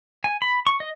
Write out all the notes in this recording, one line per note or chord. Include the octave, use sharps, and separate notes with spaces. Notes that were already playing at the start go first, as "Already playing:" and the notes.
G#5
B5
C#6
D#5